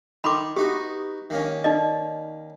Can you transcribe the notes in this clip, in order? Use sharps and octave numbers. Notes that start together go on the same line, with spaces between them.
D#3 B5 C6 D6
B3 D#4 F#4 G4
D#3 A#3 C#4
D#4 D5 D#5